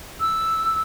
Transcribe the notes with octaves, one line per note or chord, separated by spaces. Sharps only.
E6